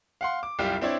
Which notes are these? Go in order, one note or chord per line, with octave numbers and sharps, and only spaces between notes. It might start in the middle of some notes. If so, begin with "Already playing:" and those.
F5 F#5 C6
D6
C2 F#2 G3 F4 G4
C4 D4 E4 C#5 D5